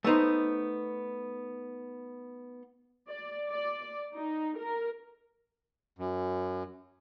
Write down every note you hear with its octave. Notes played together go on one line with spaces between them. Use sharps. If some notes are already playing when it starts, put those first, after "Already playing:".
A3 B3 D#4 C5
D5
D5
D#4
A#4
F#2